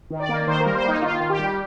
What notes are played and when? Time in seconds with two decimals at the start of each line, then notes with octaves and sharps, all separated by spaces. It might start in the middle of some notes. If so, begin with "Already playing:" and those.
0.10 D#3
0.20 D5
0.29 A#3
0.47 D#3 C5
0.61 A#4
0.66 G3
0.75 C5
0.84 A#3 D#4
1.02 D#3 F4
1.20 D#3
1.30 G4
1.39 G3